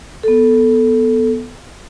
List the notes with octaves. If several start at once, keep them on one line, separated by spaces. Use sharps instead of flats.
B3 A4